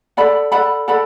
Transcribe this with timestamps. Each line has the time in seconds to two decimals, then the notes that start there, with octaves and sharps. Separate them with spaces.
0.17 A4 D5 F#5 B5
0.52 A4 D5 F#5 B5
0.88 A4 D5 F#5 B5